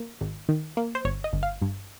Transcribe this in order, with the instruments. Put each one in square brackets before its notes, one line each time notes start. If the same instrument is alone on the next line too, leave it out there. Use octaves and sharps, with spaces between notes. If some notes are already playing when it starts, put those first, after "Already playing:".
Already playing: [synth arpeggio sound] A#3
G#1
D#3
A#3
C5
G1 C#5
D#5
G1
F5
G2